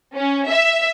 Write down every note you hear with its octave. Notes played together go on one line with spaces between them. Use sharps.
C#4
E5